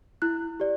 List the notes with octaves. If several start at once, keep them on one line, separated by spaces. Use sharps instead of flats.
E4 F#6
G4 D5